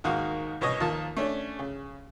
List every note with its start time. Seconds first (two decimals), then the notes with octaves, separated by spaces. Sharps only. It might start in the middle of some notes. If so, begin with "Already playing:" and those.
0.04 D#2 G#2 A#3 F#4 F5 D#6
0.61 C2 B2 C#5 D#5 D#6
0.80 D#2 F3 A#3 A5 D#6
1.17 A3 C#4 D4
1.59 C#3